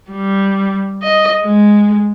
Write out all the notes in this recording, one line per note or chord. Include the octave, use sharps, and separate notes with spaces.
G3
D#5
G#3